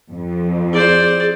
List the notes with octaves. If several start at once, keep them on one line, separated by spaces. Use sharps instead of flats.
F2
E4 G#4 C5 D5